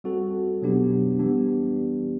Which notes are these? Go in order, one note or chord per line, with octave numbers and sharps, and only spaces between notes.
G3 C4 F#4 A4
B2 F#3 B3 D4 G4
E3 G3 B3 D4 G4